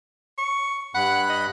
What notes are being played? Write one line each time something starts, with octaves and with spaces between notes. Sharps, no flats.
C#6
G2 F#5 B5 F#6
D#5